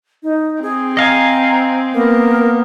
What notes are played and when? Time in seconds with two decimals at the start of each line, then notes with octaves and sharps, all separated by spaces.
0.23 D#4
0.62 C4 G#4
0.97 D#5 F5 G#5 A#5
1.94 A#3 B3 A#4